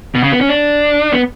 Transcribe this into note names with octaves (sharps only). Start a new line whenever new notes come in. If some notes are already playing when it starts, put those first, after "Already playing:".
B2
C#3
B3
C#4
D4
B3